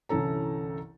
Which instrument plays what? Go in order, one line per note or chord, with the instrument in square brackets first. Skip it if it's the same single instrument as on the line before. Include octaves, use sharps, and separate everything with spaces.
[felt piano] G1 C2 E3 C#4 A4 A#5